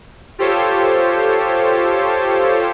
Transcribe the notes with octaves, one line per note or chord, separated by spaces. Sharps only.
F4 G4 A4 C5 C#5